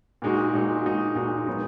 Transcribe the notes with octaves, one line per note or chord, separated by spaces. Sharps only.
A#2 G#3 D#4 F#4
A#2 G#3 D#4 F#4
A#2 G#3 D#4 F#4
A#2 G#3 D#4 F#4
F#3 B3 D#4